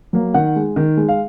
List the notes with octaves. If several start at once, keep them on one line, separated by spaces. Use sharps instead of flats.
F#3 A#3
D#3 F#5
G#3
D#3
G#3
F5